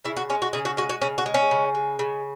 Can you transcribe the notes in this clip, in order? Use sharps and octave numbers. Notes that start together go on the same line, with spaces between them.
C#3 E4
F#4
G#3 C#4
F#4
C#3 G#4
F#4
G#3 F#4
F#4
C#3 C#4
F#4
G#3
C#4
C#3
G#3
C#3